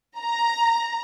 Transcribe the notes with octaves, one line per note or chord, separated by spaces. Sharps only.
A#5